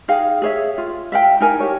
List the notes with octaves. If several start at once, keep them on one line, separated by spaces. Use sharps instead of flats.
D#4 G#4 F5 G5
G#4 C#5 E5
F4
E5 F5 G5
D#4 E4 A#4 G#5
G4 C#5